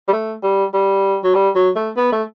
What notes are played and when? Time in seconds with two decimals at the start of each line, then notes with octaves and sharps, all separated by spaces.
0.08 G3
0.13 A3
0.43 G3
0.74 G3
1.24 F#3
1.35 G3
1.55 F#3
1.76 A3
1.97 B3
2.12 A3